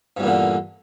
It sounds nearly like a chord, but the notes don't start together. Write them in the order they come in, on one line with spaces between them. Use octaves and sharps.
G2 E2 A#2 D3